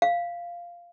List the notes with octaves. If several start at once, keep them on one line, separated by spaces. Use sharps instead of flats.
F5